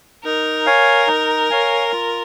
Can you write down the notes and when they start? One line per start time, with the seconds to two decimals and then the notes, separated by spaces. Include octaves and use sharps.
0.24 D#4 A#4
0.66 C#5 F5 G#5
1.07 D#4
1.50 C#5 F5 G#5
1.92 F4